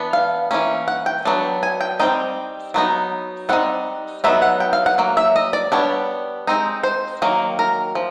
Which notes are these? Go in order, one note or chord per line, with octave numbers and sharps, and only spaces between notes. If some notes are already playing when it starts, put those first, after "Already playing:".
Already playing: E3 B3 D4
F5
E3 G3 A#3 C#4
F#5
G5
F#3 B3 D4
G#5
G5
G3 C4 D#4 G5
F#3 B3 D#4
G3 C4 D#4 F#5
F#3 B3 D#4 E5
F#5
G5
F5
F#5
F#3 A#3
E5
D#5
D5
G3 B3 D4 C#5
G#3 C4 D#4
C5
D#3 F#3 A#3
A#4
F3